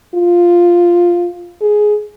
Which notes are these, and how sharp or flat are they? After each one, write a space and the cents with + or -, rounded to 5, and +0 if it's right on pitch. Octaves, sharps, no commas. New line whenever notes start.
F4 +0
G#4 +10